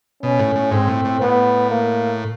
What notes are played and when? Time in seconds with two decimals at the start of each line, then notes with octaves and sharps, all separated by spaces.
0.23 B2 C#4
0.39 A2
0.56 A2
0.72 G#2 C4
0.88 A2
1.05 A2
1.21 A2 B3
1.70 A#3